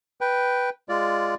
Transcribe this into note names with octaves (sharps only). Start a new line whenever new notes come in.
B4 G5
G#3 F4 D5